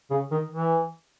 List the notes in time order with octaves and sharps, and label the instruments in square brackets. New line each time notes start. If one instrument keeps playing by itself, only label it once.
[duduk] C#3
D#3
E3